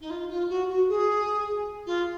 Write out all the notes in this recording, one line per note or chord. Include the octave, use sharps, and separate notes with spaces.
D#4
F4
F4
F#4
F#4
G#4
F4